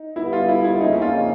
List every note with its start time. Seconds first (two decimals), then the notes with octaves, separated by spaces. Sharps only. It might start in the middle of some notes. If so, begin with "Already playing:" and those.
Already playing: D#4
0.16 D3 G3 B3 E4
0.33 F4
0.49 E4
0.64 E4
0.80 F2 C#3 F3 A#3 C#4 D#4
1.02 F4